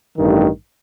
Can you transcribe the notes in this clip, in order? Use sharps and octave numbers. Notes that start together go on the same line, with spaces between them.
A1 G2 D#3